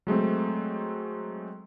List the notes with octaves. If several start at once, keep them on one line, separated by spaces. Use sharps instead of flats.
F#3 G#3 A3 C4